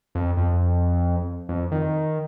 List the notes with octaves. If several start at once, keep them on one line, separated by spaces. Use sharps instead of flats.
F2
F2
F2
D#3